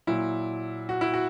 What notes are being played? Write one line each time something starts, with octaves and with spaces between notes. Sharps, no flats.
A#2 F#3 E4
F#4
E4
F#4